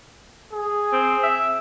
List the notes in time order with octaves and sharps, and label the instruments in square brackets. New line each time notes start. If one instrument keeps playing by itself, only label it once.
[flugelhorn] G#4
[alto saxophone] C4
E5